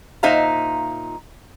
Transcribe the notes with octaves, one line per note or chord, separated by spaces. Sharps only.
A#2 D#4 C5 E5 F5 A#5